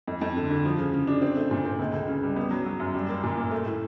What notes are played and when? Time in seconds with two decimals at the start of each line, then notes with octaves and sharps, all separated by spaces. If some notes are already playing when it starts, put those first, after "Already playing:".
0.07 F2
0.21 F2
0.37 D3
0.51 D3
0.65 F3
0.78 C#3
0.94 C#3
1.07 D4
1.22 C4
1.36 A3
1.51 A#2
1.65 C4
1.79 C#2
1.93 C#2
2.08 C#3
2.23 G3
2.36 B3
2.51 F#3
2.66 F#3
2.80 F#2
2.94 G3
3.09 A#3
3.23 A#2
3.37 A#3
3.51 A3
3.66 A2